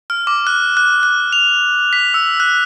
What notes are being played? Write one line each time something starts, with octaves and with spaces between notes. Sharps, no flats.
F6
D6
F#6
F#6
F#6
F7
B6
E6
F#6